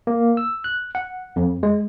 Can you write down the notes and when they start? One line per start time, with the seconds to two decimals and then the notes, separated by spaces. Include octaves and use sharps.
0.07 A#3
0.37 E6
0.64 F#6
0.95 F#5
1.36 F2
1.63 G#3